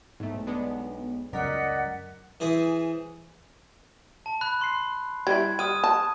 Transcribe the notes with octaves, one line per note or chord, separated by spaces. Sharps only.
B1 G#2 A3
G#3 B3 D4
C#2 F#2 A#4 D5 D#5 F#5 B6
E3 C4 G#4
A5
B5 F#6
C6 C7
G3 E4 G#6
G3 D#6 F6 D#7
A5